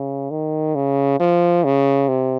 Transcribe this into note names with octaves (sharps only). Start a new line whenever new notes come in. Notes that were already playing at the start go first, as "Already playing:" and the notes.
Already playing: C#3
D#3
C#3
F3
C#3
C3